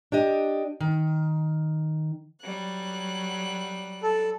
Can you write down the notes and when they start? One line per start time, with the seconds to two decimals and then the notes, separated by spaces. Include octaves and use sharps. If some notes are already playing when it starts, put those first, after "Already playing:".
0.12 D4 G4 D#5
0.80 D#3
2.42 F#3 G3 F#6
4.03 A4